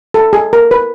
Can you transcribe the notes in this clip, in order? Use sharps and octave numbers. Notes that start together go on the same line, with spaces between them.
A4
G#4
A#4
B4